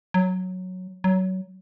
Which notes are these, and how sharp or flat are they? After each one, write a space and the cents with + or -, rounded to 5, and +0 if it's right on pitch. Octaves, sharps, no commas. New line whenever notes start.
F#3 -5
F#3 +20